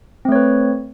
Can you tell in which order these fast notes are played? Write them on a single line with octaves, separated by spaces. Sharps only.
C4 A3 C#5 B4